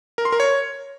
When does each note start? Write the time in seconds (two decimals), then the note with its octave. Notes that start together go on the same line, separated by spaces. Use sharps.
0.18 A#4
0.25 C6
0.32 A#4
0.40 C#5